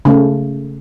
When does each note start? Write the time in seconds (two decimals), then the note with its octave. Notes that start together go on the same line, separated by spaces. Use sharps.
0.05 C#3 A3